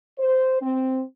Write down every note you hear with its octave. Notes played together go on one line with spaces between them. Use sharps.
C5
C4